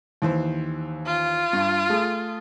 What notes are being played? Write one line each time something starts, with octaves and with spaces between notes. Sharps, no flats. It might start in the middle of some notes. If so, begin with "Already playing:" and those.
D#2 E3 C5
F4
G2
A3 G#4